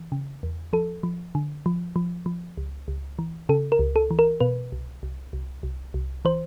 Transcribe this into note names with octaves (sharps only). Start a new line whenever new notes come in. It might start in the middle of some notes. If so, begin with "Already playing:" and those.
Already playing: E3
C#3
E2
F3 A4
F3
D3
F3
F3
F3
C#2
C#2
E3
C#3 A4
A#4
C#2
A4
E3
A#4
B2 B4
C2
C2
C2
C2
C2
E3 C5